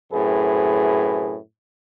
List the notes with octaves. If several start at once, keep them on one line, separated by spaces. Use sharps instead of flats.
F#2 A2 C3 G#4 B4